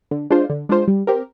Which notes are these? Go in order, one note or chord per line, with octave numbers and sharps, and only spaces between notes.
D3
G#3 D4 F4 C5
D3
G#3 D4 F4 C5
G3
C4 G4 A#4